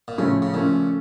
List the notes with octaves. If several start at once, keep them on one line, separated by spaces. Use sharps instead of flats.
A#2
A2 C#3 F3 A3 C#4
C#3
A#2 C#3 F3 A3 C#4